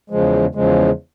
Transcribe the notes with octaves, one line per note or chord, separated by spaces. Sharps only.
E2 C#3 F3 G#3
E2 C#3 F3 G#3